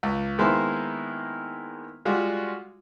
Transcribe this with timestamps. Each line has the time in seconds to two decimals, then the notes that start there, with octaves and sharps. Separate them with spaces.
0.03 C#2
0.38 D#3 G#3 A#3 B3 E4 C5
2.05 G3 G#3 F4 F#4